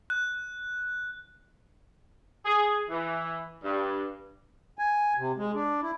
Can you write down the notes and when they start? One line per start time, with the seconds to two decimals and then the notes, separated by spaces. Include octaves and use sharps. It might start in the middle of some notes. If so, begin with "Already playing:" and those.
0.10 F#6
2.45 G#4
2.90 E3
3.64 G2
4.79 G#5
5.18 C3
5.37 G#3
5.54 D4
5.82 E4